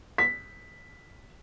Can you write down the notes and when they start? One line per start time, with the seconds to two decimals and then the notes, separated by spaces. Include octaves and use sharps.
0.18 B6